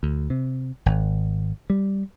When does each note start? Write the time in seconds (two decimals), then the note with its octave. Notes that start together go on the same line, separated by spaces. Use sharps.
0.03 D2
0.30 C3
0.86 G#1
1.70 G3